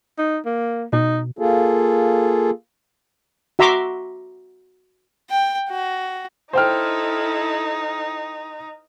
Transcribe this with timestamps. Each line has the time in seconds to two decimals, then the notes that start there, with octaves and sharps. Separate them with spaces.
0.18 D#4
0.46 A#3
0.93 B2 D#4
1.39 A#3 F4 G#4 A4
3.59 F#4 E5 A#5 C6 D6
5.30 G5
5.70 F#4
6.53 D#4 E4 A4 C5 G5 F6